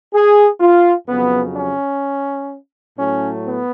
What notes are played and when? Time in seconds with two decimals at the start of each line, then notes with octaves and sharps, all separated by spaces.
0.14 G#4
0.60 F4
1.08 F2 C#3 F#3 B3
1.55 C#4
2.96 A2 F#3 A3 C#4
3.43 B3